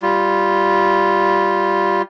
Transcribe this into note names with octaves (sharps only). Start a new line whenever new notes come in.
G3 F4